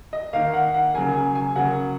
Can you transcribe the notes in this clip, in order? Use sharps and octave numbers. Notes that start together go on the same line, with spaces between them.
D#5
D#3 A#3 F5
F#5
F#5
C#3 F#3 A#3 G#5
G#5
G#5
C#3 F#3 A#3 F#5